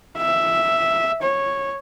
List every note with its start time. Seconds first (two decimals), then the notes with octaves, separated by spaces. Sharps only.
0.18 E5
1.22 C#5